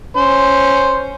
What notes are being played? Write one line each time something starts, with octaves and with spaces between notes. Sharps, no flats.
C#4 C5